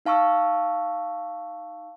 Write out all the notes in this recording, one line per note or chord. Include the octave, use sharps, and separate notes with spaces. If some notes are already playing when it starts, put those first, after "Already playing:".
D#4 F5 A5 C#6 E6